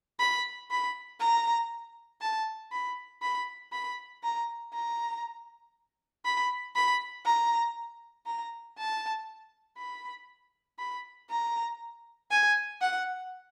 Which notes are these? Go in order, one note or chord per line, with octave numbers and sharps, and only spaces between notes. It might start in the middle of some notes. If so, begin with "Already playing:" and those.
B5
B5
A#5
A5
B5
B5
B5
A#5
A#5
B5
B5
A#5
A#5
A5
B5
B5
A#5
G#5
F#5